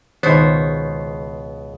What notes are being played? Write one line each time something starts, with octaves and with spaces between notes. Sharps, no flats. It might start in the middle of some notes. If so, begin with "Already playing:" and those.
C#2 B2 D#3 B3 D#4 C5 C#5